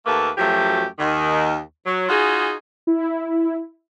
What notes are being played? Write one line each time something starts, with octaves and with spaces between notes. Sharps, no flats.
D#2 A3 A#3 A4 B4
F#2 F3 F#3 A3 G4
D#2 D#3
F#3
D#4 F4 F#4 G#4
E4